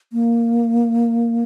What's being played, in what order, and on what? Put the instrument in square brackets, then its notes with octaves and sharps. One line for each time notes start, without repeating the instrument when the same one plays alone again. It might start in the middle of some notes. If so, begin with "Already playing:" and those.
[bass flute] A#3